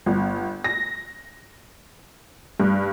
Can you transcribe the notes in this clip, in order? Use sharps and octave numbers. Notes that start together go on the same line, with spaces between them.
G1
A#6
G2